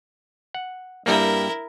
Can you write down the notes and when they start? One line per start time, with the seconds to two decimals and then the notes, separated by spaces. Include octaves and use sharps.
0.54 F#5
1.06 G2 G3 A#3 E4 A#4